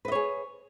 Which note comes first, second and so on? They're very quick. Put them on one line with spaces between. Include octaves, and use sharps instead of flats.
B4 D#5 C#5 G#4